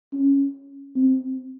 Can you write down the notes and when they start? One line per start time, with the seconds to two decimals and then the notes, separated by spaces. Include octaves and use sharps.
0.13 C#4
0.95 C4